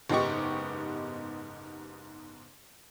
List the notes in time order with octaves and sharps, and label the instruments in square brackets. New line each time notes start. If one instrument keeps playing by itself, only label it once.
[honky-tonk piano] F#1 G#2 B3 D#4 G4 C#6